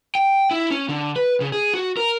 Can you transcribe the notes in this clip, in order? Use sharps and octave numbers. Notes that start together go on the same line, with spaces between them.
G5
E4
C#4
D3
B4
C#3
G#4
F#4
A#4